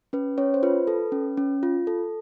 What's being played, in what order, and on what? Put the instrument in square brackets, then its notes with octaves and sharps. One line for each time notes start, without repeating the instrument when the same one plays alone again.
[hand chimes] C#4 B4
C#4 C#5
C5
F4 B4
A4
C#4
C#4
F4
A4